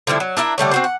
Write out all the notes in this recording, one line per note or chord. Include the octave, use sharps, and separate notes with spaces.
D3 F3 G3 E4
F#3
D4 E4 A#4 E5
D3 G3 A3 C#5
C4 F#4 C5
F#5